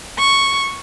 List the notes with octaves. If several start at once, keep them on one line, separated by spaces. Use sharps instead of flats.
C#6